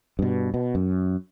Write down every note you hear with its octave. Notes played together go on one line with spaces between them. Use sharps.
G2 B2
B2
F#2